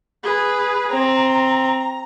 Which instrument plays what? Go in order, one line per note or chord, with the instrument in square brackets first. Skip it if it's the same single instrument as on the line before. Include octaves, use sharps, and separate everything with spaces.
[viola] G#4 B4
[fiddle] C4 [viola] A#5